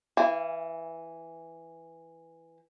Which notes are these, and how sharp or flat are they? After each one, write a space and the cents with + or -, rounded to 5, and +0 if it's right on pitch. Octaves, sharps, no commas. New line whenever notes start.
E3 +0 F5 -35 G#5 -30